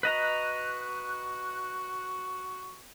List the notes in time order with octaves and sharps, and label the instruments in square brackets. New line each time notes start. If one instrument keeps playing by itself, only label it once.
[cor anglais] F#4 [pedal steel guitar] B4 D#5 A#5 [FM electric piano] F#6